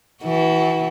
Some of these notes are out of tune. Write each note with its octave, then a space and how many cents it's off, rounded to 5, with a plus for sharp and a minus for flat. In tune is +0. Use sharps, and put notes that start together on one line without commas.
E3 -20 F#4 +20